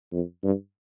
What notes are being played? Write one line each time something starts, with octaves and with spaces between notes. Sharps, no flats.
F2
G2